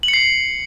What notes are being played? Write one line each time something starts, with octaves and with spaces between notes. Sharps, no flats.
F#7
C#7
C7